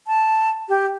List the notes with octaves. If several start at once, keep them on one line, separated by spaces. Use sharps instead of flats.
A5
G4